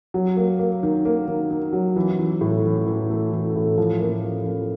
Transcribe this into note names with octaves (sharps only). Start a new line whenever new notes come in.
F#3
A#3
A#3
D#3
A#3
D#3
D#3
F#3
E3
E3
A2
E3
E3
A3
E3
A2
F3
A#3
F3
F3